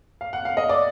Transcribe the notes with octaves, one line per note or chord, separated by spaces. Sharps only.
F5
F#5
F5
D#5
D5